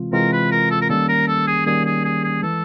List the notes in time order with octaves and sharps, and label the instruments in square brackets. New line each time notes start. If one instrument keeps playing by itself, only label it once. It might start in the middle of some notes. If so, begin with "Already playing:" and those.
Already playing: [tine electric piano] C3 E3 G#3 C4 F4
[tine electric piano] C3 E3 G#3 C4 F4 [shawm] A#4
[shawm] B4
A#4
A4
A#4
[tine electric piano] D#3 G3 A#3 C#4 [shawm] A4
[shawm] A#4
A4
G#4
[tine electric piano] D#3 G3 A#3 C#4 [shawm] G#4
[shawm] G#4
G#4
G#4
[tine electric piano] E3 G#3 [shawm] A4